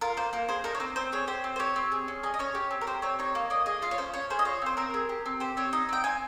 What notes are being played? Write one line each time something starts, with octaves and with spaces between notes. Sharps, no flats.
F4 A#4
A#3 C5
A#3 A#4
G#4 C5
D#4 A#4
C#5
C4 C5
C4 C5
G#4 C#5
G4 C5
C4
C5
G4 C#5
C4
G#4
C#4
G#4 D#5
D#5
C#4 C#5
G4
C4
A#4
G4 C5
C4 C#5
D#4 C#5
A#3
A#3 D#5
G#4 D#5
F4 F5
C#5
C#4 C5
C#4 C#5
G#4 C5
D#5
F4 C#5
C4 C5
C4 A#4
G#4
G4
C4
G4 C5
C4 C#5
D#4 D#5
C4 G5
C4 G#5